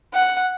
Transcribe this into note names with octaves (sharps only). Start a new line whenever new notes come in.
F#5